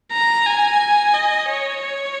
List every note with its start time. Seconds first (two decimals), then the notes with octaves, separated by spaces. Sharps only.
0.13 A#5
0.46 G#5
1.14 D#5
1.49 C#5
1.83 C#5